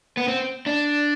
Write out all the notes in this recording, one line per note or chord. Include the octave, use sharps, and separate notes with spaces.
B3
C4
D4